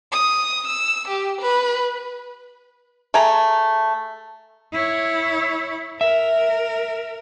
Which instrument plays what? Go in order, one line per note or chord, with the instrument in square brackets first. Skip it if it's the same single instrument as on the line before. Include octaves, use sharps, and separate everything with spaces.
[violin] D#6
E6
G4
B4
[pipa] A3 G#4 A#5
[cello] E4 C#5
[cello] A#4 [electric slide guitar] E5